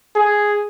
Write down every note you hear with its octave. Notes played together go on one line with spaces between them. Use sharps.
G#4